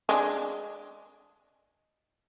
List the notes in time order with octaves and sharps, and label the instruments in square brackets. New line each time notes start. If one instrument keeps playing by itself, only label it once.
[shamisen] G#3 D4